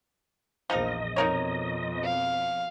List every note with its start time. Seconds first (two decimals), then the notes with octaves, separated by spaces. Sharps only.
0.70 A#1 E2 F3 D#4 A#4 D#5
1.16 F2 B2 D#4 A#4 C#5
2.04 F5